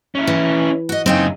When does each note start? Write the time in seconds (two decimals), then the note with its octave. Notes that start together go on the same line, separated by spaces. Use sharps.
0.15 C#4 E4
0.27 E3
0.89 F#4 D#5
1.06 F#2 C#3 C4 D#4 G5